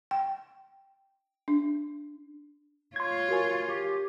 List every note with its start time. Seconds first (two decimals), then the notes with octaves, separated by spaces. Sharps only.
0.11 G5
1.48 D4
2.96 F4 C#5 C6 G#6
3.29 F#4 A#4 G#5
3.68 G4